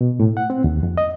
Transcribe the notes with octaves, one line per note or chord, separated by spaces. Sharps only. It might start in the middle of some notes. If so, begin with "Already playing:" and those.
B2
A2
F#5
C4
D#2
F2
D#5